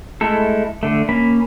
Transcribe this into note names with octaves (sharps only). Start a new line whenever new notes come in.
G#3 A3 E4 A4
D3 A3
A#3 C#4 B5